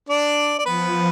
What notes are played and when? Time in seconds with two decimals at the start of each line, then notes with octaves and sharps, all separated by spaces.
0.09 D4 D5
0.58 D5
0.65 F3 B3 B4